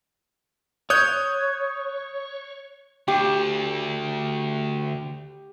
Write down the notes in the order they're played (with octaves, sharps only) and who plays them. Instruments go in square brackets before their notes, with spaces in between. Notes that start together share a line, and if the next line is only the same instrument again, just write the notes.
[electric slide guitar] C#5 [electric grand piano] D#6 F#6 G6
[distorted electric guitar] D2 [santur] G4